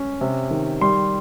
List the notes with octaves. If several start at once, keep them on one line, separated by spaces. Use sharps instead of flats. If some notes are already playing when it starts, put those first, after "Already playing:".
Already playing: C#4
C3
D#3
G3 C6